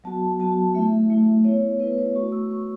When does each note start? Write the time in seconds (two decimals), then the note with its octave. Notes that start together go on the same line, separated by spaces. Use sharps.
0.04 F#3 B3 F#4 A5
0.39 F#3 B3 F#4 A5
0.75 A3 E4 E5
1.10 A3 E4
1.45 B3 E4 C#5
1.79 B3 E4 B4
1.90 B4
1.98 C#5
2.15 A3 F#4 C#6
2.32 E6
2.50 A3 F#4 C#6